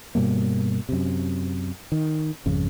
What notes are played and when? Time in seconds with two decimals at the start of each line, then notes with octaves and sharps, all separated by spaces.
0.15 G2 B2 G3 A#3
0.89 F#2 C3
1.92 D#3
2.46 G#1 F2 C#3